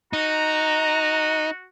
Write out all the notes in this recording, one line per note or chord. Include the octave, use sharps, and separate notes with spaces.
D#4 F#4 A#5